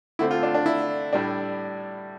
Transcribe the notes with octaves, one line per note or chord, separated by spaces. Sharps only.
D3 A3 C4 E4
F4
D4
D4
E4
A2 G3 D4